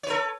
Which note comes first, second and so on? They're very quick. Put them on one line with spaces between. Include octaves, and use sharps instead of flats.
C#5 B4 A4